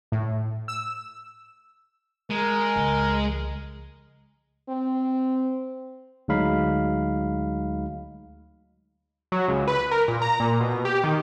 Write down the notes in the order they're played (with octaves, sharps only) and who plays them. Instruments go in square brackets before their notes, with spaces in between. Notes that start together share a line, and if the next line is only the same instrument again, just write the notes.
[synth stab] A2
E6
[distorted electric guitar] G#3 [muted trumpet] A#4
[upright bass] C#2
[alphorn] C4
[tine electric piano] D2 F#3 G#3 D#4 F5 B5
[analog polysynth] F#3
C#2
B4
A#4
A#2
A#5
A#2
B2
G4
D#3